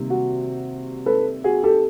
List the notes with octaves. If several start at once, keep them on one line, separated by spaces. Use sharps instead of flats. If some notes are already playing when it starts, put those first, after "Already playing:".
Already playing: C3 D#3 G3 A#3
F#4
A4 B4
F#4 G#4
G4 A4